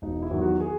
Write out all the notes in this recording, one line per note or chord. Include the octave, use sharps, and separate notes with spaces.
E1 D#4
E4
E2 D#3 F#3
F#4
G#4